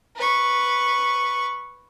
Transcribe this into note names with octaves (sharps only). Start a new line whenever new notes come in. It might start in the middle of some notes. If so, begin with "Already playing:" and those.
B4 C#6